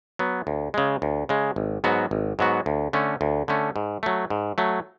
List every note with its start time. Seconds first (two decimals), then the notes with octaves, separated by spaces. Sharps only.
0.19 F#3 B3
0.47 D2
0.74 C#3 G#3
1.02 D2
1.29 C#3 G#3
1.56 G#1
1.84 G#2 F#3 B3 F#4
2.11 G#1
2.39 G#2 F#3 B3 F#4
2.66 D2
2.93 D3 A3 C#4
3.21 D2
3.48 D3 A3 C#4
3.76 G#2
4.03 F#3 A3
4.30 G#2
4.58 F#3 A3